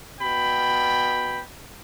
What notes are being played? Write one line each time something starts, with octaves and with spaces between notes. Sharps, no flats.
B2 G5 B5